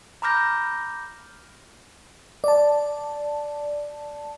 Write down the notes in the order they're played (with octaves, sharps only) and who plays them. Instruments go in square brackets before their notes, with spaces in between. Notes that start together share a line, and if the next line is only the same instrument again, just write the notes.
[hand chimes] A#5 B5 D6 F6 G6 A#6
[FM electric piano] D5 A5